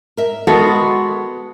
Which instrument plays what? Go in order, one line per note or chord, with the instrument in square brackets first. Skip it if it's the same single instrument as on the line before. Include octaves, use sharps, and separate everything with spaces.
[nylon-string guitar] A#4 E5
[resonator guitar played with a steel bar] G#3 B3 F#4 [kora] A4 [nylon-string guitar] A#4 D#5